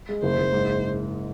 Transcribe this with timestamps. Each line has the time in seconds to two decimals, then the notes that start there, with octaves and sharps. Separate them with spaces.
0.09 G#3
0.23 F#1 C5
0.38 F#1
0.53 G#2